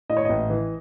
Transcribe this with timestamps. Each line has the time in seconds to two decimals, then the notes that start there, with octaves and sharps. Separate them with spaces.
0.09 A2 D#5
0.17 C#5
0.25 A1 D#5
0.50 E3